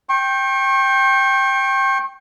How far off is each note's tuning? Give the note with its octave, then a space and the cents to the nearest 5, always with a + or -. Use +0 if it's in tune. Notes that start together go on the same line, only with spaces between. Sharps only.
G5 +0 C#6 -40